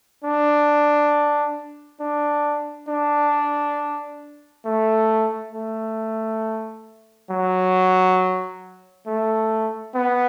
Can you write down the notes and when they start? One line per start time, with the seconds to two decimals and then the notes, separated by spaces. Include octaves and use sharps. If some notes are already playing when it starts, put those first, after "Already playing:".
0.24 D4
2.00 D4
2.88 D4
4.65 A3
5.53 A3
7.30 F#3
9.07 A3
9.95 B3